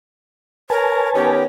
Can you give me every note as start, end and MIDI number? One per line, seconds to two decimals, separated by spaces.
0.70 1.10 70
0.70 1.35 71
0.70 1.39 73
0.70 1.35 80
0.70 1.35 81
1.15 1.45 51
1.15 1.45 59
1.15 1.45 61
1.15 1.43 67